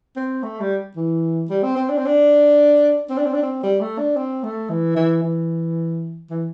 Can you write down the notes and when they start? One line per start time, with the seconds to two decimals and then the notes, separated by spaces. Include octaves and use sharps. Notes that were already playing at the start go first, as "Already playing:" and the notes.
0.16 C4
0.43 A3
0.60 G3
0.96 E3
1.50 G3
1.63 C4
1.76 C4
1.89 D4
1.97 C4
2.06 D4
3.10 C4
3.18 D4
3.26 C4
3.34 D4
3.42 C4
3.63 G3
3.81 A3
3.98 D4
4.16 C4
4.43 A3
4.70 E3
4.96 E3
5.23 E3
6.30 E3